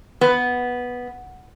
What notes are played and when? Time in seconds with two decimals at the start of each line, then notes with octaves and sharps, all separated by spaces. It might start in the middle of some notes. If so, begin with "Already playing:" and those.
0.21 B3